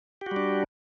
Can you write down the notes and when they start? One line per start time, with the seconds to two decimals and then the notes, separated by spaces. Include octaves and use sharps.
0.21 G4
0.26 F#4
0.31 G3
0.36 D4